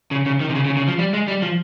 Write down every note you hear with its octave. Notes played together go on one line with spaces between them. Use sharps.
C#3
C#3
D#3
C3
C#3
C#3
C#3
F3
G3
G#3
G3
F3